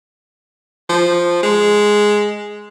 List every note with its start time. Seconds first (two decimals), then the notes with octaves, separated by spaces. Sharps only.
0.89 F3
1.43 G#3